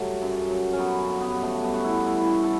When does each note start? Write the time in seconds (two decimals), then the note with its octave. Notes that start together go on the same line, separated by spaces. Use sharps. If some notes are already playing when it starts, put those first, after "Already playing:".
Already playing: F#3 G3 A3
0.22 F#2
0.50 F#3
0.72 C#4
0.78 F#3 B3
1.07 G2
1.21 B3
1.35 G2
1.42 A3
1.63 G2 B3
1.74 F#4
1.84 E4
1.91 E3
2.06 E4
2.21 E3
2.27 F#4
2.43 A4